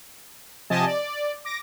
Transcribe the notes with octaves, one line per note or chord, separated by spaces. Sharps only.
C3 F3 G4 D#5 G#5 A5
D5
D6 A#6